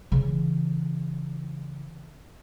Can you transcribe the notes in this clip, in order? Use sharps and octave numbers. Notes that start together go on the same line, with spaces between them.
C#3 E3